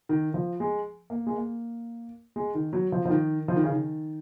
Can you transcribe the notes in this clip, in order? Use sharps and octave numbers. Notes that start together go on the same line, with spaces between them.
D#3
F3
G#3
A#3
G#3
A#3
G#3
D#3
F#3
F3
F3
D#3
F3
D#3
C#3
D#3